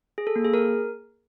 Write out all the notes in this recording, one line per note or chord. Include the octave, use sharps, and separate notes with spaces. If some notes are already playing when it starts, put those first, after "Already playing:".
G#4
A4
A#3
G#4
A#4